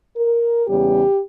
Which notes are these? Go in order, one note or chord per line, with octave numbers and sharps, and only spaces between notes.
A#4
E2 C#3 G3 C#4 G4